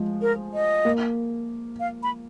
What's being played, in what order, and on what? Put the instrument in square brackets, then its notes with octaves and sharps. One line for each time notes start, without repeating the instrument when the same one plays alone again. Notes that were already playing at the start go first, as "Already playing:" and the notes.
Already playing: [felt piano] F3 G#3
[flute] A#4
D#5
[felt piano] A#3
[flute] F5
B5